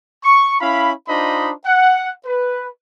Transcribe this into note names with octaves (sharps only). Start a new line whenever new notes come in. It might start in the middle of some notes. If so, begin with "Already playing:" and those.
C#6
C#4 E4 F5 B5
D4 D#4 F4 C5 D#5 B5
F#5
B4